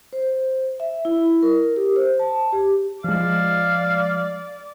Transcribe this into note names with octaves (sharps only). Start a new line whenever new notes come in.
C5
E5
E4
A#4
G4
C5
A5
G4
F3 G#3 D5 F5